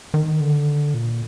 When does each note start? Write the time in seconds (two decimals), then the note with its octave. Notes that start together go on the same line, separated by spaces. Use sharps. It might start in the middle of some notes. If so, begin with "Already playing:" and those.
0.14 D#3
0.40 D3
0.94 A#2